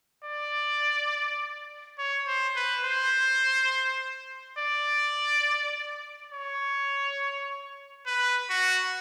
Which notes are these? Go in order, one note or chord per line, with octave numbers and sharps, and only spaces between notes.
D5
C#5
C5
B4
C5
D5
C#5
B4
F#4